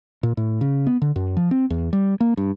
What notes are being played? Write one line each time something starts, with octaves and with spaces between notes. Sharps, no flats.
A#2
A2
C#3
B3
D3
F#2
F3
C4
E2
G3
A#3
G2